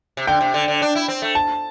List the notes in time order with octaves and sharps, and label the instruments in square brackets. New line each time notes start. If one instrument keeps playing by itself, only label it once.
[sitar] C3
[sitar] D3 [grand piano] G5
[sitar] C3
D3
D3
D4
E4
C4
A3
[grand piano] A5